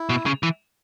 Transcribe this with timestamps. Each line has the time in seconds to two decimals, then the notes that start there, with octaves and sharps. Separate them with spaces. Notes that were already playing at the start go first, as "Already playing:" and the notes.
Already playing: E4
0.09 B2
0.26 C#3
0.43 E3